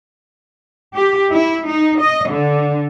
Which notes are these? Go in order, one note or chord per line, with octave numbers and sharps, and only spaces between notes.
G4
E4
D#4
D#5
D3